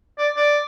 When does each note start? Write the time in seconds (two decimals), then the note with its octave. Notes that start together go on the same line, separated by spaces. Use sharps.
0.18 D5
0.37 D5